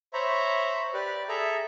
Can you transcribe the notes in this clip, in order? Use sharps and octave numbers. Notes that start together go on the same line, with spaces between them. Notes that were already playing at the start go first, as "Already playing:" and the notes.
C5 C#5 E5 A#5 B5
G4 B4 D5
G#4 A4 E5 A#5